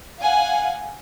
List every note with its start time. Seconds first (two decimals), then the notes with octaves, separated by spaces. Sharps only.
0.20 F5 F#5 G#5